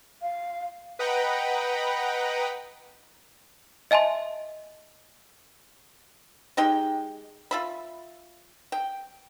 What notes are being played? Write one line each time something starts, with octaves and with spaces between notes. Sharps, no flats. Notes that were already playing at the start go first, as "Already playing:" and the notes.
F5
B4 D#5 F#5 G5 A#5 B5
D#5 E5 G#5 A5 C6
G#3 D#4 G4 G5
F4 E5 B5
G5